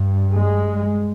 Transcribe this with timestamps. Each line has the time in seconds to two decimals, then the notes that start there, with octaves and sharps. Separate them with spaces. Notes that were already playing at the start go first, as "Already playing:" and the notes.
Already playing: G2
0.35 G#3